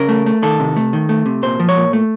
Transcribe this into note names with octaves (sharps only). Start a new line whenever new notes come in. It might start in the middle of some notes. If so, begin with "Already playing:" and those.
Already playing: C#3 A#4
A3
A3
D#3 A4
C3
A3
D#3
A3
C3
A#2 C5
F3
C#5
A#2
A3